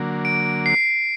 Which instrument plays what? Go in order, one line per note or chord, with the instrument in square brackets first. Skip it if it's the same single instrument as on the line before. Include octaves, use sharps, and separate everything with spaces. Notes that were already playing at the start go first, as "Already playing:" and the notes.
Already playing: [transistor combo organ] D3 F#3 A#3
[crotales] D7
C7